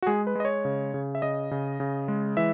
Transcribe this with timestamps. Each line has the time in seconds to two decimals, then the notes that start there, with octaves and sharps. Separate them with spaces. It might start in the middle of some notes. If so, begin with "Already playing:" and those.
0.02 F#4
0.07 G#3 G#4
0.27 B4
0.35 G#3 D#5
0.45 C#5
0.65 C#3
0.94 C#3
1.15 E5
1.22 C#3 D#5
1.51 C#3
1.80 C#3
2.08 G#3
2.37 E3 E5